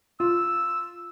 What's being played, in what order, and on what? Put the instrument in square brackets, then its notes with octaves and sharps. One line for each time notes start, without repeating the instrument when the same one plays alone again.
[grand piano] F4 [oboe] E6